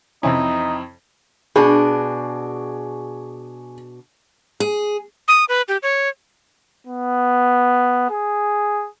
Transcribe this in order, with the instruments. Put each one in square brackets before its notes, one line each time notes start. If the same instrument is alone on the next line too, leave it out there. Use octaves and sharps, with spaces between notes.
[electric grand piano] F2 C4 E4 [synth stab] C3 E3 C#4 [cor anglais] D#4
[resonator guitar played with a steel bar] B2 D4 [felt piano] G#4
[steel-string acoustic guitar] G#4
[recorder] D#6
B4
G4
C#5
[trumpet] B3
G#4